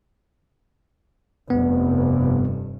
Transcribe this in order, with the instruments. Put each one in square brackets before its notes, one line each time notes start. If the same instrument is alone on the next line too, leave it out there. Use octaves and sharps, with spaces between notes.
[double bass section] F1 G2 [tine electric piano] B3